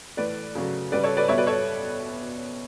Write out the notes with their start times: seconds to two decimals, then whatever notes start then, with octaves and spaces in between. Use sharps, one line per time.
0.17 A2 E3 A3 B4 D5
0.55 C#3 F#3 A3
0.92 C#3 G3 B4 D5
1.04 A4 C#5
1.17 B4 D5
1.28 B2 G3 C#5 E5
1.38 B4 D5
1.46 A4 C#5